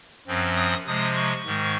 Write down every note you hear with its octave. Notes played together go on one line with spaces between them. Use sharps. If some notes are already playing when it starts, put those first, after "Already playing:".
F#2 F3 C4
D#6
C3 F3 G#3 D#6
C#6
G#2 D#3 G#3